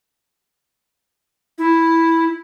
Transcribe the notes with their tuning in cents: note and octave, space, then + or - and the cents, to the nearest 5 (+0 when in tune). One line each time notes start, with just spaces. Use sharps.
E4 -5